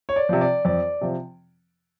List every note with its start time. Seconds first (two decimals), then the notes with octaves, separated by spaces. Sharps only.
0.09 C#5
0.16 D5
0.29 C3 F3
0.41 D5
0.65 F2 D5
1.01 C3 F3